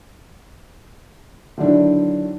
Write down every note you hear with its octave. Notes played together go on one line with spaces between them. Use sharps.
D3 D#3 F#3 D4 E4